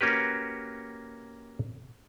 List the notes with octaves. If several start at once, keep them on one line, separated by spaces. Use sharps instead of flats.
A#3 C#4 F#4 G4 B4